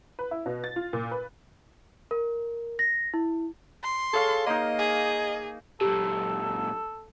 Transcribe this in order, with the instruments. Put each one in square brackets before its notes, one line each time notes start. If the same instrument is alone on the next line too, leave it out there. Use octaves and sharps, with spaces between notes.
[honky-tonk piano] B4
E4
B2
A6
F4
A#2
B4
[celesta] A#4
A#6
E4
[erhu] C6
[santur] G#4 C#5 F5 [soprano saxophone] A4
[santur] A#3 D#4 [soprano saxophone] D#5
[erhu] G#4
[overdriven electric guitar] F#2 A#2 [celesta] G4 [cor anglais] A4